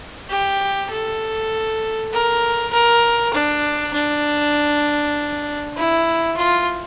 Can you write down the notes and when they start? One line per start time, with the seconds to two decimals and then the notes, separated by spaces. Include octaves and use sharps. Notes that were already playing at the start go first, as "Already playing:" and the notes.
0.30 G4
0.91 A4
2.13 A#4
2.73 A#4
3.34 D4
3.94 D4
5.77 E4
6.37 F4